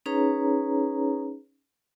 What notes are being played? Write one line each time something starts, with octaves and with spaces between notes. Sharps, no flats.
C#4 D#4 G#4 B4 C#5 A#5